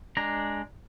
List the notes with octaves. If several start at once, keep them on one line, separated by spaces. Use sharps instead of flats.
G#3 D4 A#5